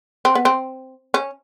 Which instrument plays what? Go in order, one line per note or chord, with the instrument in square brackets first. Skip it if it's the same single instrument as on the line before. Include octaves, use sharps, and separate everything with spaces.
[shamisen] C4
B3
C4
C#4